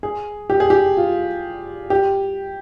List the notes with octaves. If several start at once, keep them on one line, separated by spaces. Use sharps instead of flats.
G#4
G4
G#4
G4
F4
G4